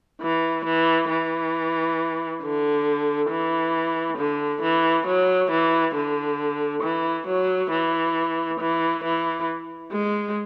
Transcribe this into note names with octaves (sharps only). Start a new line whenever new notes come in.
E3
E3
E3
D3
E3
D3
E3
F#3
E3
D3
E3
F#3
E3
E3
E3
G#3